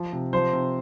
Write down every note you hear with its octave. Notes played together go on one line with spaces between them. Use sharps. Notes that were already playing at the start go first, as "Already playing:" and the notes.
Already playing: F3
C3
F3 C5
C3